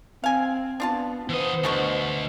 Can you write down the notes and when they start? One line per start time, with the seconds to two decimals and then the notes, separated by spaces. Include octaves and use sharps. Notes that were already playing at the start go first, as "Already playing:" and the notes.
0.24 C4 F5 G#5
0.80 B3 D4 F4 A5
1.29 E3 B3 C5 D#5
1.64 D2 B2 D3 A4 C#6